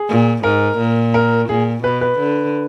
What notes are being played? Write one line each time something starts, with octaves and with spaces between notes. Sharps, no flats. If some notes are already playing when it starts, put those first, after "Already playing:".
Already playing: G#4
A#2
G#2 A#4
A#2
A#4
A#2 G#4
B2 B4
B4
D3